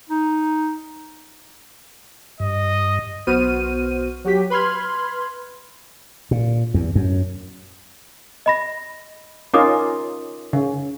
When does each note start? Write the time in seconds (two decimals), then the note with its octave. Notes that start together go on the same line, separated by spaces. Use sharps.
0.10 D#4
2.40 G2 D#5
3.27 B1 B3 F#4 C5 F6 D#7
4.24 F#3 F#4 G4 B6
4.50 B4 B5 C6 F6 G#6
6.31 A#2
6.74 E2
6.95 F#2
8.46 D#5 B5 A#6
9.54 C#4 D#4 F4 A#4 D6 D#6
10.53 C#3